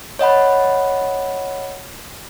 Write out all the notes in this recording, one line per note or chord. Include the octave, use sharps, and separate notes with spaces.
C#5 D#5 F#5 B5